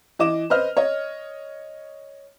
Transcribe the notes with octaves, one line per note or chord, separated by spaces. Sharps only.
E3 D#5 D6 E7
B4 C5 D#5 F6
C#5 D#5